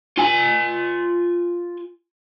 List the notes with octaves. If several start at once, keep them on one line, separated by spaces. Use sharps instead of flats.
F4 G#5